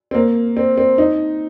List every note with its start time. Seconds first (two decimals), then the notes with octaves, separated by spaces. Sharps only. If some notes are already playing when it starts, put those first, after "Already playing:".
0.11 C4
0.14 A#3
0.57 C4
0.78 C4
0.98 D#4